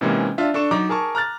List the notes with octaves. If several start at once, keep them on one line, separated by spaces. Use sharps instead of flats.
G#2 C3 E3 G#3 A#3 C#4
D4 F4 E5
D4 A4 C#6 E7
F#3 D#4 A#5 D6
G#4 A#4 A5 C#6
A#5 F6 F#6 A6